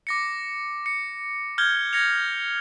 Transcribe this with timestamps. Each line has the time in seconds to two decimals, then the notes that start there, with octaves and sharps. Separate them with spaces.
0.07 D6 A#6 C#7
0.86 C#7
1.58 F6 G6 G#6 G7
1.93 G#6 A#6 C#7 F7